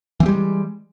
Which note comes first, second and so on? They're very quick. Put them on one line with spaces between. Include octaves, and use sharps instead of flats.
E3 C4 G3 G#3